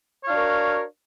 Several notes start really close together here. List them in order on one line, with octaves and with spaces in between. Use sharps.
C#5 F5 D4 F#4 A#4